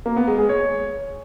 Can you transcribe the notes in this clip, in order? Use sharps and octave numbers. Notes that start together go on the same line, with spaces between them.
A#3
B3
G#3
G#4
C#5